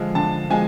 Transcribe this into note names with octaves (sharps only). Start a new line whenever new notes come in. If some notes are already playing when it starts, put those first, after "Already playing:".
Already playing: D3 F3 G#3
D3 A5
F3 G#3 G#5